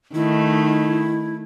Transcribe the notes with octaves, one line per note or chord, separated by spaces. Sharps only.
D#3 A3 D#4 E4